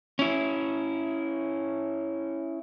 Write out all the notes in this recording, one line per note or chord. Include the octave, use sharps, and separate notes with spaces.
C#4 E4